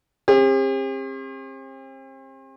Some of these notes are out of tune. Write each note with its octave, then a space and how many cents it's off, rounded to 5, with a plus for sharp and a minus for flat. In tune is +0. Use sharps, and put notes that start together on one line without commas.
C4 +40 G4 +45